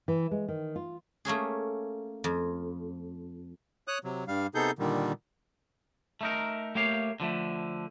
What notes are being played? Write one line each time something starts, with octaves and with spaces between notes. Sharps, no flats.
E3
G#3
D#3
F4
A3 A#3 C#4 G#4
F2
C#5 D#6 F#6
C3 F#3
G2 G3 F5
C3 B3 D#4 G#4 A4 G6
A#2 D3 D#3 G3
A3 D#4 A#4
A3 A#3 G4 C#5 F5
D3 F3 A3